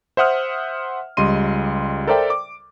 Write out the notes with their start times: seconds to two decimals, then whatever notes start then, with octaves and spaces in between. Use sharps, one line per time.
0.17 C5 E5 F#5 D#6 F6
1.17 C#2 G3 D#5 C6 D#7
2.07 A4 A#4 C5 D5 E5 G5
2.30 D6